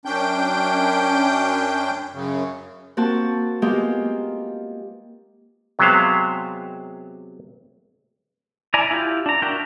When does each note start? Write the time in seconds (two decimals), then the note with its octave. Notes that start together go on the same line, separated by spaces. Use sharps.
0.05 F#2 C#4 D4 G5 G6
2.14 F#2 C#3
2.97 A#3 C4 F#4 A5
3.62 G#3 A#3 B3 F4 G4
5.79 C3 F#3 G#3 B3 C5 F5
8.74 E4 D5 G#5 A#5
8.91 E4 F4 G4
9.26 D4 A#5
9.42 D4 F#4 A#4 E5 G5